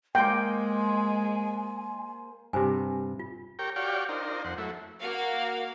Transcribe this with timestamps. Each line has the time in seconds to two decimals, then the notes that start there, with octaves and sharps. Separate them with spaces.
0.15 G#3 A#3 C5 G5 G#5
2.53 G2 C3 G4 C5 G#5
3.19 F4
3.59 G4 A#4 C#5 G5
3.76 F#4 G4 C#5 D5 F5 G5
4.09 D4 D#4 F4 A#4 C5
4.45 F2 C5 F#5
4.58 F#3 A3 E4
5.01 A#3 F#4 F5